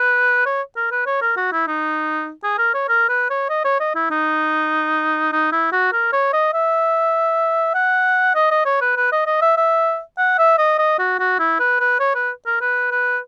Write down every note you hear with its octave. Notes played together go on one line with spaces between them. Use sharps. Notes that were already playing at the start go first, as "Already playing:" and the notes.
Already playing: B4
C#5
A#4
B4
C#5
A#4
F#4
E4
D#4
G#4
A#4
C#5
A#4
B4
C#5
D#5
C#5
D#5
E4
D#4
D#4
E4
F#4
A#4
C#5
D#5
E5
F#5
D#5
D#5
C#5
B4
B4
D#5
D#5
E5
E5
F#5
E5
D#5
D#5
F#4
F#4
E4
B4
B4
C#5
B4
A#4
B4
B4